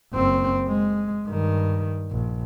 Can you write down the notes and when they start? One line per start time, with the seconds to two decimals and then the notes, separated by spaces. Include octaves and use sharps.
0.13 F#1 C4
0.68 G#3
1.26 G2 D#3
2.11 A#1